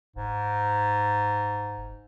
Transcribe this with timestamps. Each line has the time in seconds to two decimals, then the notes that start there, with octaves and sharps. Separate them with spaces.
0.16 F#1 G#2